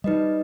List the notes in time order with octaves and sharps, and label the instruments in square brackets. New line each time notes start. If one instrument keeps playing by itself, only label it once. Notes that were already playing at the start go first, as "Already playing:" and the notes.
[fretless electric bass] G3 [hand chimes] D#4 B4 D#5